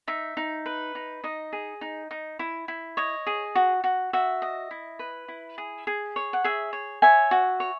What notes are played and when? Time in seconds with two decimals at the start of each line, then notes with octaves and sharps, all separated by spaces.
0.08 D#4 E5
0.37 D#4
0.66 B4
0.95 D#4
1.24 D#4 D#5
1.53 G#4
1.81 D#4
2.11 D#4
2.39 E4
2.68 E4
2.97 C#5 D#5
3.27 G#4
3.55 F#4
3.84 F#4
4.13 F#4 E5
4.42 D#5
4.71 E4
4.99 B4
5.28 E4
5.58 G#4
5.87 G#4
6.16 C#5
6.33 F#5
6.44 G#4 E5
6.73 C#5
7.02 C#5 E5 G#5
7.31 F#4
7.60 C#5